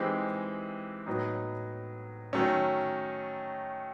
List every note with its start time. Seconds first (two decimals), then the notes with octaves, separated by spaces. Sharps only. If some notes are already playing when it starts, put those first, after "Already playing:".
Already playing: E3 G#3 C4 D#4 G4
1.06 A2 F#3 B3 D#4
2.33 D#3 F#3 A3 C#4